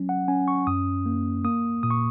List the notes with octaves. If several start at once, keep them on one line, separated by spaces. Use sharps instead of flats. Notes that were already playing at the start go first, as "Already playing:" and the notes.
Already playing: F#3 C#4
F#5
C#4 G#5
C#6
F#2 D#6
A#3
A#3 D#6
A#2 D#6
C#6